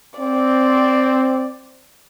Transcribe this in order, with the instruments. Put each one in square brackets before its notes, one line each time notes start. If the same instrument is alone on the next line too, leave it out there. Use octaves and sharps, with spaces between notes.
[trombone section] C4 [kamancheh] D5